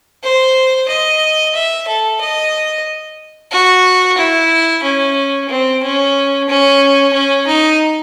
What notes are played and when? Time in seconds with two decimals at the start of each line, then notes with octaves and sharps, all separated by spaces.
0.23 C5
0.88 D#5
1.55 E5
1.88 A4
2.21 D#5
3.52 F#4
4.18 E4
4.83 C#4
5.49 C4
5.83 C#4
6.49 C#4
7.13 C#4
7.47 D#4